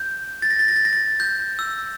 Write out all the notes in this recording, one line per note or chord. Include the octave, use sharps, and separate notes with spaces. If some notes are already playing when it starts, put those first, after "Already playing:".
Already playing: G6
A6
A#6
A6
A#6
A6
A#6
A6
G6
E6